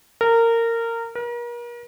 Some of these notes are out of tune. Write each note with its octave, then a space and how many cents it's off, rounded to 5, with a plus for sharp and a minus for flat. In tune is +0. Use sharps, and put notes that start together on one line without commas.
A#4 -20
A#4 +40